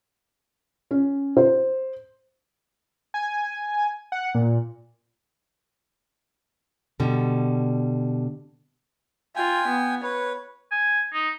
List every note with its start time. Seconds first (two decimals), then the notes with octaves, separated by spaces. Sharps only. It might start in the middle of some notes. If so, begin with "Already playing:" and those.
0.91 C#4
1.37 C5
3.14 G#5
4.12 F#5
4.35 A#2
7.00 B2 D3 G3
9.36 F4 G5 G#5
9.68 B3
10.03 B4 C#5
10.72 G#5
11.13 D#4